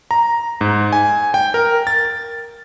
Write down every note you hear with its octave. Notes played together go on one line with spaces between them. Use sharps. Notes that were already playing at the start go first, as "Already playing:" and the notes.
A#5
G#2
G#5
G5
A#4
A6